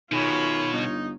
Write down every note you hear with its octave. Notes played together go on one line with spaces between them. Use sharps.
F#2 B2 D#3 F4 G#4 C#5 B5
G1 D#4